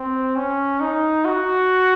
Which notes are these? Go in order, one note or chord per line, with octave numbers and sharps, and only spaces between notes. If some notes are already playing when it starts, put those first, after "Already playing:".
Already playing: C4
C#4
D#4
F#4